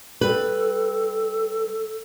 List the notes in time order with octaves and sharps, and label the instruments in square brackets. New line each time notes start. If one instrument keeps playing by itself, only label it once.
[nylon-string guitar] G3 B4 [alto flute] A4